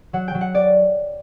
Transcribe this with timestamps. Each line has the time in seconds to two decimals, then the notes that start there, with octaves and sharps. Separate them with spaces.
0.13 F#3 F#5
0.28 G5
0.35 F#3
0.41 F#5
0.55 D5